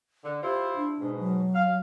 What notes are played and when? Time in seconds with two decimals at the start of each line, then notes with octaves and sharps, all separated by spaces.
0.24 D3
0.43 E4 F4 G4 C5
0.76 D4
1.00 G#2 B2
1.19 F#3
1.54 F5